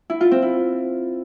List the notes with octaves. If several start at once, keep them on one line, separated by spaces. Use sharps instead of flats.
E4
F4
C4
E4